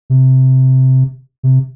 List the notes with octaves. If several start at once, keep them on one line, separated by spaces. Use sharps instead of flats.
C3
C3